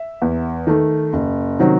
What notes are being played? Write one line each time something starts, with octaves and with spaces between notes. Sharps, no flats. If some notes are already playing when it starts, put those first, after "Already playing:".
Already playing: E5
E2
D#3 A3
F#1
C3 D#3 F#3